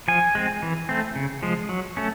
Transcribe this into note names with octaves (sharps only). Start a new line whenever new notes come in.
F3 G#5
G#3 C4
E3
A3 C4
C#3
F3 G#3
F#3
A3 C#4